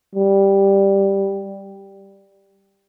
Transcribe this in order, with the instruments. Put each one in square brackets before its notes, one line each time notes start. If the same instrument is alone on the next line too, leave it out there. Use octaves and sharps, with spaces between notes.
[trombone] G3